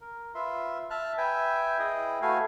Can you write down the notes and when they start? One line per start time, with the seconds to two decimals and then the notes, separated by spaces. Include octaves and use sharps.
0.01 A#4
0.35 F4 B4 E5 C6
0.90 E5 A5 F6 F#6
1.18 B4 E5 G5 G#5
1.79 E4 G#4 B4 D#5 G5
2.22 A3 F#4 A4 B4 F5 G#5